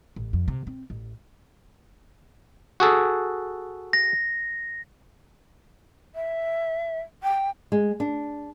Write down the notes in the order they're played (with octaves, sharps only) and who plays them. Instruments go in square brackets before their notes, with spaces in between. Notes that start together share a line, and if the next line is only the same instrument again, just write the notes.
[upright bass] A1
F2
C3
C4
A1
[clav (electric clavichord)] F#4 G#4 A4
[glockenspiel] A#6
[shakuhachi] E5
G5
[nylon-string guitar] G#3
D4